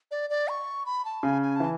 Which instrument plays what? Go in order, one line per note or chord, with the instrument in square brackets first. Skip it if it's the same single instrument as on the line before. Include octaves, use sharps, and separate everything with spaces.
[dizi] D5
D5
C#6
B5
A5
[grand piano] C#3 [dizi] G#5
[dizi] G#5
[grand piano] E3 [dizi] A5